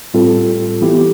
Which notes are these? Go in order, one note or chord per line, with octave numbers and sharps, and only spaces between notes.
A2 G3 C4 F4 A4
E3 B3 E4 G4